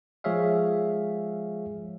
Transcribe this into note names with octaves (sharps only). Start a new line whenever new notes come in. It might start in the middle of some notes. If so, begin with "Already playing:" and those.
F3 G#3 G#4 C#5 E5 F5